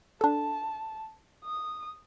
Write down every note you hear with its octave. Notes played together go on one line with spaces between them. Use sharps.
D4 A4 A5
D#6